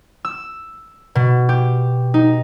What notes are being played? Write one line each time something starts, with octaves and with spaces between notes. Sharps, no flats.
E6
B2
G4
D#4